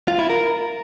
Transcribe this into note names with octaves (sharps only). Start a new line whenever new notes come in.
F4
E4
A#4